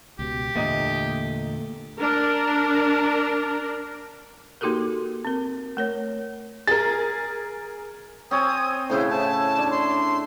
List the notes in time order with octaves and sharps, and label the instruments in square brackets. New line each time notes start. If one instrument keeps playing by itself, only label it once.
[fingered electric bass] C#2 B2 [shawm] G4
[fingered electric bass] E2 A#2 D3 [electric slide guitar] A3 A#3 D#5
[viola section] D4 A#4
[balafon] A#3 D#4 F#4 G4 A4 A#4
C4 A#4
A3 A#4 C#5
[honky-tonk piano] G#4 A#4 [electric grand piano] A6
[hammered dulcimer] C4 C#5 G#5 [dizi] D#6
[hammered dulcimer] A2 C#3 E4 [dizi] C5
[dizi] A5
[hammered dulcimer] D4
[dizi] C6